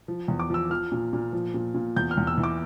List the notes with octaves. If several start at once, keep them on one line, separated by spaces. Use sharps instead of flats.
F3
E2
D6
F3 E6
F3 F6
A#2
A#2
F3
A#2
A#2
E2 G6
F6
E2
E6
E3
D6